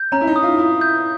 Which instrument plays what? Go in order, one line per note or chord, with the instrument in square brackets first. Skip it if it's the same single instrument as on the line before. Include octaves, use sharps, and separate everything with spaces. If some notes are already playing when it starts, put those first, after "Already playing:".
Already playing: [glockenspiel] G6
[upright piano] C#4 [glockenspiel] A#5
[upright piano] E4
D#4
[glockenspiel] D#6
[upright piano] F4
[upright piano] E4 [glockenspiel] A#5
[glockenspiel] G6